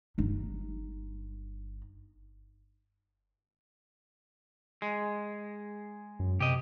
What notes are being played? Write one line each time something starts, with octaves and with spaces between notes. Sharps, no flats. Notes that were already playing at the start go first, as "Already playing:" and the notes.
G1 D#4
G#3
F#2
C3 G4 D#5